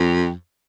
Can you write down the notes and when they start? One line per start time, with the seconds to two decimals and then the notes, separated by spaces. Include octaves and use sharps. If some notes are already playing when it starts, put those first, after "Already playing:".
Already playing: F2